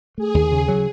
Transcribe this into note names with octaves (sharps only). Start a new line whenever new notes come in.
A3 G#4
D#2
C#3
F#3